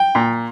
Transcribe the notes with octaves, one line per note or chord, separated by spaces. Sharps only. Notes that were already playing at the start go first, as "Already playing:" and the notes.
Already playing: G5
A#2